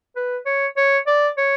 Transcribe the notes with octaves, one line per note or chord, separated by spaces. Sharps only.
B4
C#5
C#5
D5
C#5